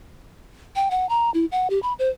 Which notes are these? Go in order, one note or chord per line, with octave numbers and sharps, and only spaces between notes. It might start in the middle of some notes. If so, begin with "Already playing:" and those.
G5
F#5
A#5
E4
F#5
G4
B5
C5